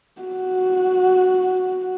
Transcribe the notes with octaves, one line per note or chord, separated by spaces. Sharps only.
F#4